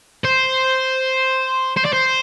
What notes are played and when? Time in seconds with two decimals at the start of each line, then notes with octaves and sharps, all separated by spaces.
0.24 C5
1.77 C5
1.85 D5
1.93 C5